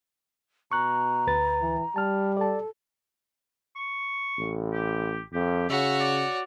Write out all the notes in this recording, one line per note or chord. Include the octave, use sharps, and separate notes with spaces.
B2 A#5 C#6 F#6
D2 B4 A6
E3
G3 A5 F6
A4 D5 A5
C#6
A1
G4
F2 G4
C#3 F#4 C#5 E5
D5